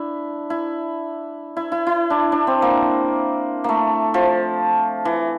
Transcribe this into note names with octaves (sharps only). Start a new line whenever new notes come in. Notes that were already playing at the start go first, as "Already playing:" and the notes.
Already playing: D4 E4
E4
E4
E4
E4
D4
D4
C4
A#3
A3 A#3
F3
E3